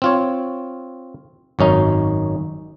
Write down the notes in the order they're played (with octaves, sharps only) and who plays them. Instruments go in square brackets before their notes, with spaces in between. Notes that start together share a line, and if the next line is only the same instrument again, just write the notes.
[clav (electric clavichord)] C4 F4 C#5
G#1 F#2 C#4 D#4